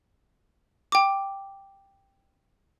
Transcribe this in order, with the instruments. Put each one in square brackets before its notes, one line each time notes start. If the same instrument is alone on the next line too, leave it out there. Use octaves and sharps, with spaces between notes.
[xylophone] G5 D6